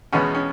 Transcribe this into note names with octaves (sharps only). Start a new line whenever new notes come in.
E2 B2 G#3 B3 C#4
C#4